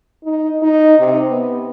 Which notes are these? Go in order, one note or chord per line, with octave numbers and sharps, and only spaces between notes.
D#4
D#4
C3
B3